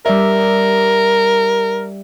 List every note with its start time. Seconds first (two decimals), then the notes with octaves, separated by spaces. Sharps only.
0.06 G3 A#4 D5 E5